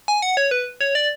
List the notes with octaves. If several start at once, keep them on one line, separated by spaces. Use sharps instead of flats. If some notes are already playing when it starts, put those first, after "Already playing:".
G#5
F#5
C#5
B4
C#5
D5